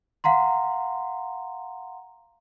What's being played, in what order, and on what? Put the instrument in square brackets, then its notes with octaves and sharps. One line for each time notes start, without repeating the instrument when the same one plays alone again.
[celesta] F5 F#5 A#5 C6